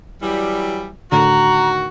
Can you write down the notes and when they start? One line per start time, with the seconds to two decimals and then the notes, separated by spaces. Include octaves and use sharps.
0.21 E3 F#3 G3
1.12 A2 D3 D#3 F#4 A#5